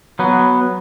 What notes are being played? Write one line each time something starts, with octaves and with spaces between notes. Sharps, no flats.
F#3 B3